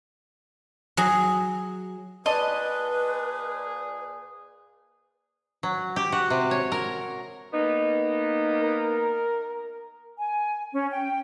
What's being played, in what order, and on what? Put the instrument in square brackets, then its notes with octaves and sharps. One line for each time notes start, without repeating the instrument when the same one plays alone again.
[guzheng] F#3 G#4
[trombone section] A#2 G#4 [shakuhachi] B4 [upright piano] D5 A5 C6 [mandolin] D#5
[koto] F#3
G4
F#4
C3
C#5
A#4
[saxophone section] A#3 B3 D#4
[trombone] A#4
[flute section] G#5
C#4
G5